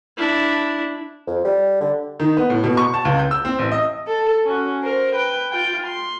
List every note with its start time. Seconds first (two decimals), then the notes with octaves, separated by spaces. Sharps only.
0.17 D4 E4
1.27 F2
1.45 G3
1.81 D3
2.20 D#3
2.37 B3
2.50 A2
2.64 B2
2.77 C#6
2.94 A5
3.05 C#2
3.19 G6
3.31 E6
3.45 C4
3.59 A1
3.72 D#5
4.07 A4
4.45 C#4 F#4
4.83 A#4 C5
5.15 B4 G5
5.51 F4 G5
5.87 C6